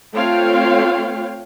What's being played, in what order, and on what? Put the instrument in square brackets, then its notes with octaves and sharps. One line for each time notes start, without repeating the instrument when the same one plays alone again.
[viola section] A3 C4 F4 C#5 F5 G5